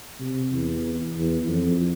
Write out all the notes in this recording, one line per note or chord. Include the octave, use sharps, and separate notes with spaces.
C3
E2
E2
F2